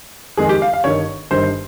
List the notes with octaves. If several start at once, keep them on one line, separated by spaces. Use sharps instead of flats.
F2 D#3 G#3 C4 G#4
G4
F5
F5
G1 G2 D#3 C#5
G1 G2 D#3 C5